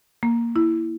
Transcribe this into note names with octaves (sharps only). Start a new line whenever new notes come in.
A#3
E4